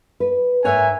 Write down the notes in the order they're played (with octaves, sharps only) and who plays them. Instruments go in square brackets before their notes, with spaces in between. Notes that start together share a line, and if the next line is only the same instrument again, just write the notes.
[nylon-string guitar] B4
[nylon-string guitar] G#2 A#4 C#5 [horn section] E5 F#5 G#5